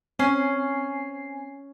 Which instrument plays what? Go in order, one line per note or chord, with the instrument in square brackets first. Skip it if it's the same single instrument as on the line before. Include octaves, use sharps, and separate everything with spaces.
[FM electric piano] C4 G#5 C7 [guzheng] C#4